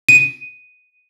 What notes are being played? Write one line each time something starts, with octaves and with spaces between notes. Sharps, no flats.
D#7